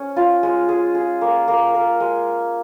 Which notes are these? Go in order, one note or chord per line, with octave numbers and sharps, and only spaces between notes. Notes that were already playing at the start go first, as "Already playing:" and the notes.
Already playing: C#4
F4
G#3
G#4
G#4
A#3
A#3
A#4
G#3